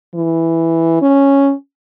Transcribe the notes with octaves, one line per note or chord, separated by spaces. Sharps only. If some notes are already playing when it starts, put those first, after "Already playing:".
E3
C#4